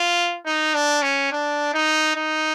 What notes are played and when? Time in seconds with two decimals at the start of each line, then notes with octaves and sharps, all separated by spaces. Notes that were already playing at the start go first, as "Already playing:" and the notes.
Already playing: F4
0.46 D#4
0.75 D4
1.03 C#4
1.32 D4
1.74 D#4
2.16 D#4